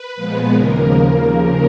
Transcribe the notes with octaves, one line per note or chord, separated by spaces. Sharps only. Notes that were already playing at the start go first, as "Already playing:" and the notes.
Already playing: B4
A#2 F3 G#3 B3
D#2 C#3 F3 A#3 A#4